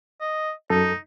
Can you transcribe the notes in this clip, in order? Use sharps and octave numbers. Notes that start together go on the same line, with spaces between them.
D#5
F#2 D#4 A4